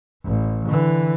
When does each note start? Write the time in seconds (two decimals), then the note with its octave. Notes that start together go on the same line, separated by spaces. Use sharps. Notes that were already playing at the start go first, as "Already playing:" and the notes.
0.25 A1
0.69 D3 E3